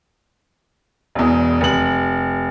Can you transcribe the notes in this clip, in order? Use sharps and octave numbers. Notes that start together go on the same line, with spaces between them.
E1 E2
F1 F#7